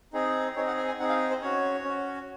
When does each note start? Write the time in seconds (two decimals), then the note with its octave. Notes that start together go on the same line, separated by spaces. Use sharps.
0.13 C4 D#4 G#4
0.56 C4 D#4 G#4 C#5
0.68 F#5
0.77 G#5
0.88 G#5
0.98 C4 D#4 G#4 F#5
1.09 F5
1.31 C5
1.42 C#4 F#4 C#5
1.84 C#4 F#4